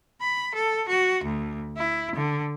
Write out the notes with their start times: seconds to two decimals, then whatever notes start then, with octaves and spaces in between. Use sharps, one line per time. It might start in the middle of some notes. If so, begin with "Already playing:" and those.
0.20 B5
0.54 A4
0.89 F#4
1.24 D2
1.78 E4
2.16 D3